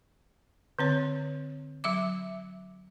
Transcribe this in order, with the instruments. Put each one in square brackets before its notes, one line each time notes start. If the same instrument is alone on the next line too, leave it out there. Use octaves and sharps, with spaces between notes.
[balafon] D3 C4 C#5
F#3 E5 D6